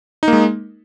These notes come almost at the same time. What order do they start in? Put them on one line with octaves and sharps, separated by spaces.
D#4 A#3 G#3